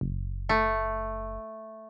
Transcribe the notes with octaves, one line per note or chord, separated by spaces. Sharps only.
F#1
A3